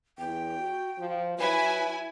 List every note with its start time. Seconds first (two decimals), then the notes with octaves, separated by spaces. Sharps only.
0.18 E2 G5
0.58 F#4
0.99 F3
1.38 F#3 E4 B4 G#5